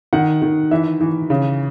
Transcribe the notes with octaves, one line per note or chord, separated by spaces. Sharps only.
D#3 F#5
D#3
E3 E5
E3
C#3